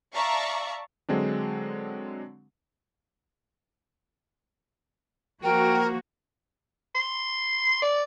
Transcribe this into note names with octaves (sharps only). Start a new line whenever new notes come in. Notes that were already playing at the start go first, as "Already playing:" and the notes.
D5 E5 F5 A5 A#5 C#6
D3 F#3 G#3 C4 D4
F3 A#3 F#4 A#4 G5
C6
D5